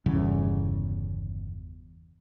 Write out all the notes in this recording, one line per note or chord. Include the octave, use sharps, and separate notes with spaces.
G1 E2 C#3